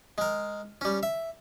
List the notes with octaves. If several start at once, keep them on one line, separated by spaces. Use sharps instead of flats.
G#3 A#4
G3 C#4
E5